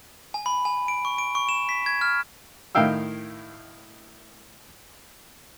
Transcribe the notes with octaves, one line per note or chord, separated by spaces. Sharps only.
G#5
B5
G#5
D7
C#6
D7
C#6
E7
B6
G#6
F6
A2 D#3 E4 F5 G5 E6